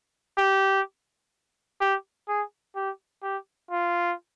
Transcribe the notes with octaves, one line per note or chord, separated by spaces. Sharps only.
G4
G4
G#4
G4
G4
F4